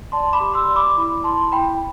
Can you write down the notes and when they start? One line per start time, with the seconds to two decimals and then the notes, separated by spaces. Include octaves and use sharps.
0.12 D5 A5 C6
0.33 B5 D6
0.40 G4
0.54 C6 E6
0.68 D5
0.76 B5 D6
0.96 E4 B5 D6
1.24 E4 A5 C6
1.52 E4 G5 B5